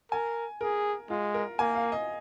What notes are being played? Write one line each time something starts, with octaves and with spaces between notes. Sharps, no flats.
A#4 G#5
G#4 A#4
G#3 F4
A#4
A#3 G#5
F5
D#5